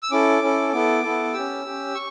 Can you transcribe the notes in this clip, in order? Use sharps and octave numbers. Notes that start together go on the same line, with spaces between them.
E6
C#4 E4 A4 D6
C#4 E4 A4
B3 E4 A4 D6
B3 E4 A4
C#4 G4 E6
C#4 G4
C#6